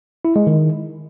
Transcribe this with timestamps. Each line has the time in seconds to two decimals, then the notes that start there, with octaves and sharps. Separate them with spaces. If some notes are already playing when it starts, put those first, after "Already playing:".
0.25 E4
0.36 G#3
0.47 D#3